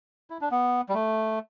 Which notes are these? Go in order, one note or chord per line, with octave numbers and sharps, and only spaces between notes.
E4
D4
B3
G3
A3